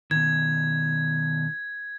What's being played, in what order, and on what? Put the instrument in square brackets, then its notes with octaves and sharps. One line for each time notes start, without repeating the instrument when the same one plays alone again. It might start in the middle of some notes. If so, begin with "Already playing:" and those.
[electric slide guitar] B2 D#3 [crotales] G#6